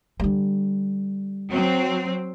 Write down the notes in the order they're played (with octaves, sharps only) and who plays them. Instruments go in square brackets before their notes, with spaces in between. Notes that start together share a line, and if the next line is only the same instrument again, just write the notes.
[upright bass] D3 G3
[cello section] F#3 C4